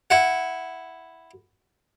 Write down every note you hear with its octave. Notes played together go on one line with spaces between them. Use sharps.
E4 F#5